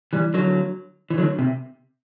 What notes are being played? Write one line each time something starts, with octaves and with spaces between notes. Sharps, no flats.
E3 G3
D3 F#3
E3
D3 F#3
C3